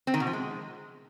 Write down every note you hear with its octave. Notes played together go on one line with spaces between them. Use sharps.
C4
D#3
B2
F3
G#3